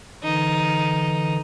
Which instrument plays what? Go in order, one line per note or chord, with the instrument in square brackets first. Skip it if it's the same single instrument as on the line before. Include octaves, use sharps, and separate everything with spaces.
[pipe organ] D3 E3 [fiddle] D#4